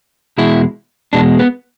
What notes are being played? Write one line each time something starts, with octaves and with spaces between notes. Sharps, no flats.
E2 B2 G#3 E4
E2 B2 G#3 D4
B3